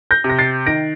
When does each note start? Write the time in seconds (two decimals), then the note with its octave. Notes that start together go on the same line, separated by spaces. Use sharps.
0.11 G6 A#6
0.24 C3
0.30 A#6
0.39 A6 C7
0.66 D#3 A#6 D7